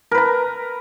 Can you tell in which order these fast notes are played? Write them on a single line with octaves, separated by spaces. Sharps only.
A#4 B4 A#5